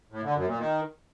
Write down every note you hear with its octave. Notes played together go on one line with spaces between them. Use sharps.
A2
D3
F#2
A#2
D#3